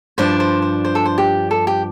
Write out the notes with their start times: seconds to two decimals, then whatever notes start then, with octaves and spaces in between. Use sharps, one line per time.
0.18 G2 F3 D4 C5
0.40 C5
0.62 C5
0.85 C5
0.95 A4
1.05 C5
1.18 G4
1.51 A4
1.67 G4